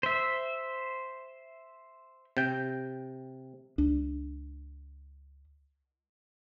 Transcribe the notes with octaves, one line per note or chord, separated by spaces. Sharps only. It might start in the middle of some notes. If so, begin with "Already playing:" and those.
C5 E5
C3 G5
C#2 D4